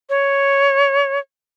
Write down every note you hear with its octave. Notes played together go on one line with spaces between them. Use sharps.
C#5